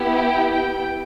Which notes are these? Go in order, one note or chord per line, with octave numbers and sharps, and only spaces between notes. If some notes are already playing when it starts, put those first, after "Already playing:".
Already playing: B3 E4 G4
G5
G5